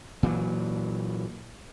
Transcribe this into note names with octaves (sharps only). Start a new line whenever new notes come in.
A#2 E3 F#3